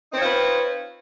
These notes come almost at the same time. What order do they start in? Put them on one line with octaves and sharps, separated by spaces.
D#4 C4 C#5 F4 B4